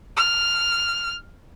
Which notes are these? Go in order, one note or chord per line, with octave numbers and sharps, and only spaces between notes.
F6